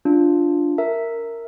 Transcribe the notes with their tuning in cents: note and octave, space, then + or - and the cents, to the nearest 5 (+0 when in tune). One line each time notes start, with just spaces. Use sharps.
D4 +0 F4 +0
A#4 -10 E5 +0